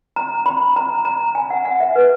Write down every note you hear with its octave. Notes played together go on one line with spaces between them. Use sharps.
A#5
B5
A#5
A#5
G#5
F#5
F#5
E5
B4